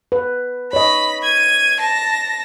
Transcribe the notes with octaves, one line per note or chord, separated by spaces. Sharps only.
B4
C#5 D#5 B5
G#6 D#7
A5 A#6